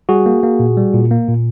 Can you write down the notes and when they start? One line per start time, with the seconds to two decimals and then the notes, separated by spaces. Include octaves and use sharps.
0.09 G3 F#4 G#4
0.26 A#3
0.43 A#3
0.59 A#2
0.77 G3
0.94 A#2
1.11 A#3
1.28 A#2